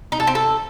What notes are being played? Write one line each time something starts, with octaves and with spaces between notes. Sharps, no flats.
D#4
A4
C4
A4